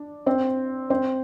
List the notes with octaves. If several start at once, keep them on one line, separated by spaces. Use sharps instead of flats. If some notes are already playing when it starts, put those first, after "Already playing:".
Already playing: D4
C4 C5
C4 C5